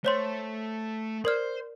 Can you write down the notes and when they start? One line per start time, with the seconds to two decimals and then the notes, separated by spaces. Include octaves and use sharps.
0.05 A3 C5 C#5 C6
1.25 A#4 C5 D5 F6